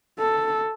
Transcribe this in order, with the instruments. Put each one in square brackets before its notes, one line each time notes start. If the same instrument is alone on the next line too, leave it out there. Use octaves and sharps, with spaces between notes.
[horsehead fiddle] A4